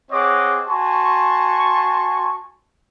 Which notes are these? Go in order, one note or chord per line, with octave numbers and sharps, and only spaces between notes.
C4 G#4 C#5 D#5 F#5 D6
F#4 G#5 A5 C6 C#6